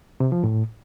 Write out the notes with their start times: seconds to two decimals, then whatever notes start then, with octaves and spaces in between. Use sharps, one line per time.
0.20 C3
0.32 F3
0.44 A2